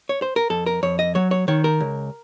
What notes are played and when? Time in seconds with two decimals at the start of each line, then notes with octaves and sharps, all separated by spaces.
0.09 C#5
0.22 C5
0.36 A#4
0.50 F2 A4
0.66 A#4
0.83 F2 C#5
0.99 D#5
1.15 F#3 C#5
1.31 C#5
1.48 D#3 C#5
1.64 A#4
1.80 C#2